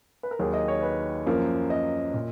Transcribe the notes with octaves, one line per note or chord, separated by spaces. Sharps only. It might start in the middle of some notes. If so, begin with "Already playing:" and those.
B4
A#4
D#2 D#3 F#3 G#4
D#5
C#5
B4
F#2 F3 A#3
D#5
A#2